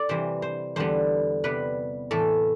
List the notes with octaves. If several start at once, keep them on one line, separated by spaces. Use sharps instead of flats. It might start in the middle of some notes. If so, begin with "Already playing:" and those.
Already playing: A4 D5
C3 E3 G3 C5
C5
E2 D3 G3 B3 C5
C3 G3 B3 B4
A2 E3 A3 A4